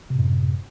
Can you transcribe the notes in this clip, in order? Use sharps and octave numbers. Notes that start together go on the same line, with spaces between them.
F#2 A2 C3